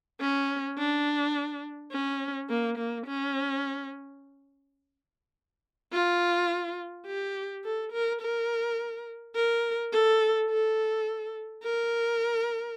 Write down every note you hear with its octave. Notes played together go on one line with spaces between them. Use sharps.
C#4
D4
C#4
A#3
A#3
C#4
F4
G4
A4
A#4
A#4
A#4
A4
A4
A#4